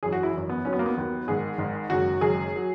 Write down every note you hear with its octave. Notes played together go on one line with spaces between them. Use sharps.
G#1 F#2 E3 G#4
F#4
E4
G#1 F#2 E3
B3
D#2 D#3 F#3 C#4
B3
A#3
B3
D#2 D#3 F#3
G#1 G#2 D#3 G#4
G#1 G#2 D#3
F#1 F#2 D#3 G#3 F#4
F#1 F#2 D#3 G#3 G#4
F#3